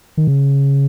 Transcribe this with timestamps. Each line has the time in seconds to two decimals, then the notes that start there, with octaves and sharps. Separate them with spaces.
0.17 D#3
0.27 C#3